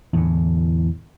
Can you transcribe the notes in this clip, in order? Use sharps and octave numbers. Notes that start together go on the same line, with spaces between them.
E2 A2 D3